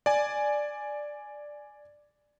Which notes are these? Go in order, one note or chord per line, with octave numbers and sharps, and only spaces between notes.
D5 G#5